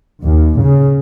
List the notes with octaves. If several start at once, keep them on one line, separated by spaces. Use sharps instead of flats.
D#2
C#3